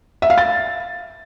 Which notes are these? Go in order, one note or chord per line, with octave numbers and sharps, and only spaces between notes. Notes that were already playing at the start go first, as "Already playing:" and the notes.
E5
F5
A6